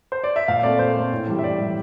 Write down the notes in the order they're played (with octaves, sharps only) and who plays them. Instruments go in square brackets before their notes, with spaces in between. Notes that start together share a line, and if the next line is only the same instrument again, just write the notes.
[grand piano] C5
D5
E5
A#2 F5
A3 C4 D5
A#2 C5
A3 C4
A2
E3 G3
E5
A2 D5
E3 G3